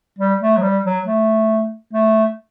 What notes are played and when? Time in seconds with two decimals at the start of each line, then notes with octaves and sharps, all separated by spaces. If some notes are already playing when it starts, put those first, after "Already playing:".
0.18 G3
0.41 A3
0.57 F#3
0.62 G3
0.85 F#3
1.06 A3
1.93 A3